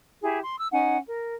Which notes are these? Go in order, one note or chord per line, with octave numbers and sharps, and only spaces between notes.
E4 G4 G#4
C6
E6
C#4 D#4 F#5 G#5
A#4